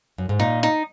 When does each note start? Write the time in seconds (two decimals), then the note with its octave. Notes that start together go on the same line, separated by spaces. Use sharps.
0.18 F#2
0.29 G#2
0.39 A#2 D#4
0.63 D#4